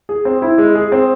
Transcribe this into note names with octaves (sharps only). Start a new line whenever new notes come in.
G#4
C4
E4
G#3
G#4
C4